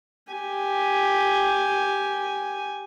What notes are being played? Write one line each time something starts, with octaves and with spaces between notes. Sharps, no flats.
G4 G#5